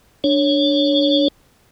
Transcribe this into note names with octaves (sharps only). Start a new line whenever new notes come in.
D4 C#5